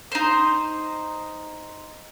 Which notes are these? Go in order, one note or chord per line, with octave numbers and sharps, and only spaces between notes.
D#4 C5